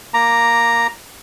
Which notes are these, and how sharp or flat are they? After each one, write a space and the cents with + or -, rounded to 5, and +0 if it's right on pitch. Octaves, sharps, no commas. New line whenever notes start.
A#3 +0 A#5 +0 D6 +0